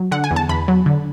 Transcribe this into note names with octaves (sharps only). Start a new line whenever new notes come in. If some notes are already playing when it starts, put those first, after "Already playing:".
Already playing: F#3
D3 F#5
G#5
E2
A5
E2 B5
F#3
D3